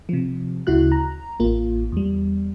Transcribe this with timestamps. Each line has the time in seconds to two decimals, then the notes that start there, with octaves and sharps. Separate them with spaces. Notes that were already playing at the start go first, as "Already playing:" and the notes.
0.09 C3 F3
0.67 D2 C#3 E4 F#4 F#6
0.92 A#5
1.40 A1 A#3 F4
1.92 E2 G3